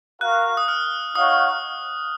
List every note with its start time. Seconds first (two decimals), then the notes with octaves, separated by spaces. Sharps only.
0.21 F#4 A#4 F5 F#6
0.57 D#6
0.68 F6
1.16 D#4 F#4 C#5 F5 D#6